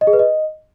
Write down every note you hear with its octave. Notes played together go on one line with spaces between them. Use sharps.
D#5
G#4
B4
D#5